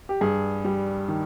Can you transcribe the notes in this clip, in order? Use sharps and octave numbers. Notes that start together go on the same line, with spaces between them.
G4
G2 G#4
G3
D#3